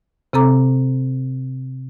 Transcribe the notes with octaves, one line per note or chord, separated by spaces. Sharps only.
C3 C4 A4 A#5 D6